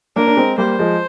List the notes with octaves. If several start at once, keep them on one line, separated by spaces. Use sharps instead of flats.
A#3 D4 A#4
D4
G#3 C4
G3 A#3 C5
F3 G#3